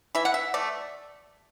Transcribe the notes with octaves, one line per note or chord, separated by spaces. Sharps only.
E3 E5
F#5
E5
A3 D5